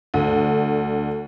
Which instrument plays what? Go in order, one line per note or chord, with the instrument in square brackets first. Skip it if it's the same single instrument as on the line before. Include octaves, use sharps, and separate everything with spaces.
[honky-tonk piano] D2